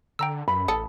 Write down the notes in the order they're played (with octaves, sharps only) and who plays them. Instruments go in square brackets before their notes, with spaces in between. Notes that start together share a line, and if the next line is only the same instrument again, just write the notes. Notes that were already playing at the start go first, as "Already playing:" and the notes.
[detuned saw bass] D3 [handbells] G5 A#5 E6
[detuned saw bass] F#2 [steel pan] B5
[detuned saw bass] A1 [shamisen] A4 [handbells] D#6 C#7